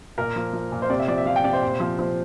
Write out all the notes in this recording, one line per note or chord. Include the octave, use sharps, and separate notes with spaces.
A#2 A#4
F3
F3
A#2
C5
C3 D5
E5
F3 D5
E5
F3 F5
G5
C3 D5
C5
A#2
F3
F3